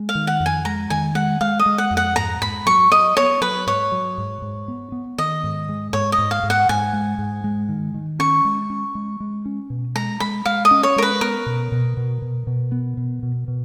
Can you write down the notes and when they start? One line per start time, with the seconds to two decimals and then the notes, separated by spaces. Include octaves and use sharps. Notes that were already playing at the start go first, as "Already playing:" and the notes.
Already playing: G#3
0.09 F5
0.15 D#3
0.27 F#5
0.40 F2
0.46 G#5
0.65 G#3 A#5
0.90 D#3 G#5
1.15 G#3 F#5
1.41 G#3 F5
1.59 D#5
1.66 G#3
1.78 F#5
1.91 F2
1.97 F#5
2.16 G#2 A#5
2.42 G#2 B5
2.66 F#3 C#6
2.92 F#3 D#5
3.17 B3 C#5
3.41 F#3 B4
3.67 G#2 C#5
3.92 F#3
4.18 G#2
4.42 G#2
4.68 B3
4.92 B3
5.18 D#3 D#5
5.44 G#2
5.69 G#3
5.93 G#2 C#5
6.12 D#5
6.18 G#2
6.31 F5
6.43 G#2
6.50 F#5
6.69 G#2 G#5
6.93 G#3
7.18 G#2
7.44 G#3
7.69 D#3
7.94 D#3
8.19 C#4 C#6
8.45 G#3
8.70 C#4
8.95 G#3
9.20 G#3
9.45 C#4
9.70 B2
9.96 G#3 A#5
10.20 G#3 B5
10.45 G#3 F5
10.65 D#5
10.71 C#4
10.83 C#5
10.96 G#3 A#4
11.02 B4
11.21 B3 A#4
11.46 B2
11.72 B2
11.97 B2
12.22 B2
12.47 B2
12.72 B3
12.97 B2
13.23 B2
13.48 B2